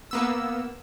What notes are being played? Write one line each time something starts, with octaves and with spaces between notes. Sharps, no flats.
A#3 B3 E6